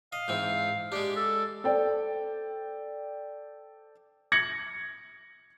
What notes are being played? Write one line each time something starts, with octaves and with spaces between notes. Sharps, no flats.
D#5 F5
G#2 E3 C4
G#3 D4 G4
A4
A4 C5 D5 G5
G#6 A#6 C#7 F#7